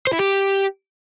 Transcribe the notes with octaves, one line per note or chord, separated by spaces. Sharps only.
C5
E4
G4